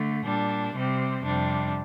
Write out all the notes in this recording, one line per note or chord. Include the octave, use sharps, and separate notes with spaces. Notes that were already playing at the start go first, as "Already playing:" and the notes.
Already playing: D3 A3
A#2 G3 D4
C3 G3 C4
F2 C3 G3 D4